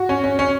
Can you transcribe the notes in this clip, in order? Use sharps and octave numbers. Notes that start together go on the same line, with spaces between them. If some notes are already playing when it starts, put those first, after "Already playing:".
Already playing: F#4
C#4
C#4
C#4